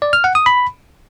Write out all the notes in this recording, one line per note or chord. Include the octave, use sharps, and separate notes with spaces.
D5
F6
F#5
D#6
B5